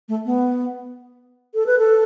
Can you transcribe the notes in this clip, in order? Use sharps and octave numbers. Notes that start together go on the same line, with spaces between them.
A3
B3
A4
B4
A4